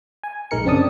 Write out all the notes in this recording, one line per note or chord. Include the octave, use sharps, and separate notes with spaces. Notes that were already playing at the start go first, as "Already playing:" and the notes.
G#5
A#1 G#3 D#4 A#4 C#7
F#2 C#3 C4 D4 A5 D#6